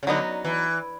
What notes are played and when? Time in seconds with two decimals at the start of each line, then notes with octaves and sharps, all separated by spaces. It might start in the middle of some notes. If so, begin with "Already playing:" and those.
0.03 C#3
0.07 D3 F#3 B3 D#4 F#4
0.44 E3